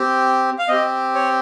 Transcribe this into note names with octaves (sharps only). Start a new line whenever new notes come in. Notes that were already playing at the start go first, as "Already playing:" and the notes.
Already playing: C4 G4
F5
C4 G4 D#5
C#5